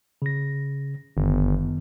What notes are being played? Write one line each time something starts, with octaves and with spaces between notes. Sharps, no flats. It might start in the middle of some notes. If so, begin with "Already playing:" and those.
C#3 A#6
G1 F#2 D#3 B3